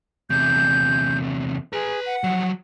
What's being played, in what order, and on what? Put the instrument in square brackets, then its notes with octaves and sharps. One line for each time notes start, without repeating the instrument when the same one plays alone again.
[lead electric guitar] E2 C3 [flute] G6
[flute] G#4 [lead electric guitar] B4 A#5
[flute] F#5
[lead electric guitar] F3 F#3